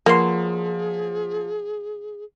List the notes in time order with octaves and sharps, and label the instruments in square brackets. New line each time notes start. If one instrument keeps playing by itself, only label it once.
[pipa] B2 F#3 C6 [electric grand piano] F3 [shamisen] A#3 [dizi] G#4